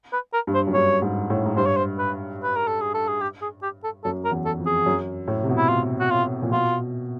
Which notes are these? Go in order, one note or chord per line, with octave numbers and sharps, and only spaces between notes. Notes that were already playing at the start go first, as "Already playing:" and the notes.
B4
A#4
G2
C5
F#2
G2 C#5
G#2
A2
G#2
G2 C5
C#5
C5
B4
B4
A#4
A4
G#4
A4
G#4
G4
G#4
G4
A4
F#2 A4
A#4
E2
A4
F2
G#4
F#2
A2
C3
B2
E4
F4
F#4
F4
A#2
B2 F4